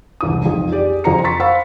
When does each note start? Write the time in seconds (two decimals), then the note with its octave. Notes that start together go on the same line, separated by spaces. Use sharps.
0.21 E1 C2 D#6
0.44 B1 F2
0.72 G4 G#4 D5
1.04 F2 F#4 C5 A#5 C#7
1.24 A#5 C6 C#6 A6 B6
1.40 C5 F5 F#5 B5 C#6 E6